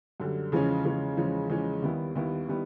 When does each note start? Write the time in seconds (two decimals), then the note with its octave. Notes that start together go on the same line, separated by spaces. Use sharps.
0.20 F#2 D3 G3
0.52 E2 C#3 F3 G#3 C#4
0.85 E2 C#3 F3 G#3 C#4
1.17 E2 C#3 F3 G#3 C#4
1.50 E2 C#3 F3 G#3 C#4
1.82 D#2 D#3 G3 B3 E4
2.15 D#2 D#3 G3 B3 E4
2.48 D#3 G3 B3 E4